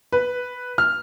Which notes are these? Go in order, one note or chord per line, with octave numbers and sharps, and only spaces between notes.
B4
F6